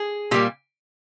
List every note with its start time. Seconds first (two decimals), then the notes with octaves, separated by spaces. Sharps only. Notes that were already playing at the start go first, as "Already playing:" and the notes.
Already playing: G#4
0.31 A#2 G3 A#3 G4